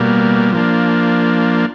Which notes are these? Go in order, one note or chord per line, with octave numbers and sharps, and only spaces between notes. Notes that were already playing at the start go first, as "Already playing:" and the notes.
Already playing: B2 G3 A#3
F3 A#3 D4